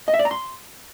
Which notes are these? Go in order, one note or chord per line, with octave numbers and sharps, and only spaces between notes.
D#5
E5
D5
A#5
C6